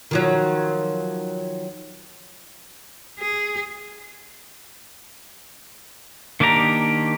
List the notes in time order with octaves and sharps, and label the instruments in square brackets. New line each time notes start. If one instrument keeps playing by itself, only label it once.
[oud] D#3 F3 F#3
[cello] G#4
[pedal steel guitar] D#3 A#3 D4 G4 A#5